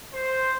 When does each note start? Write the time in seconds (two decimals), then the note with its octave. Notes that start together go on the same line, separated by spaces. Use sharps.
0.13 C5